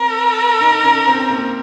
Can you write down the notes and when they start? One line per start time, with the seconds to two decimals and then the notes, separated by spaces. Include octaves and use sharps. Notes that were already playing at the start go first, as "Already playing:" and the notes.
Already playing: C4 A#4
0.61 D#4
0.84 C#4
1.07 C4
1.19 C4
1.30 A#3